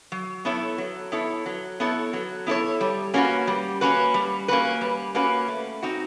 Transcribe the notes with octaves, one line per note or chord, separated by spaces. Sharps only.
F#3
B3 E4 A4 C#5
F#3
B3 E4 A4 C#5
F#3
B3 E4 A4 C#5
F#3
B3 E4 A4 C#5
G3
A#3 C#4 F#4 B4
G3
A#3 C#4 F#4 B4
G3
A#3 C#4 F#4 B4
G3
A#3 C#4 F#4 B4
A3
C4 D#4 F#4